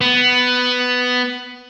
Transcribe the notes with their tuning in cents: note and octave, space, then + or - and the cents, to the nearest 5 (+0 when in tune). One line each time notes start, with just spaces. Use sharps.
B3 +10